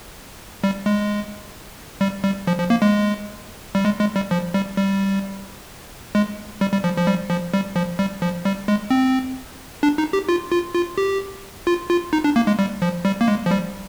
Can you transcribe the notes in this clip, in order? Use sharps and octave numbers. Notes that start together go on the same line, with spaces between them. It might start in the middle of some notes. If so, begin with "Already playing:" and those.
G3
G#3
G3
G3
F3
F3
A#3
G#3
G3
G#3
G#3
G3
F3
G3
G3
G#3
G3
G3
F3
F3
G3
F3
G3
F3
G3
F3
G3
G#3
C4
D4
D#4
G4
F4
F4
F4
G4
F4
F4
D#4
D4
A#3
G#3
G3
F3
G3
A#3
G#3
F3
G3